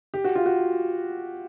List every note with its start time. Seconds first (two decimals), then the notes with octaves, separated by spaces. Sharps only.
0.14 G4
0.24 F#4
0.35 F4
0.46 F#4